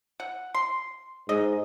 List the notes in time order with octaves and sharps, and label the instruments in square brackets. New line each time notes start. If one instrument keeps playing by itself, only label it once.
[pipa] F#5
C6
[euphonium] G#2 [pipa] D#5